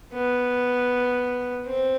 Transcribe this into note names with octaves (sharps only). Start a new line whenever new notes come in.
B3
C4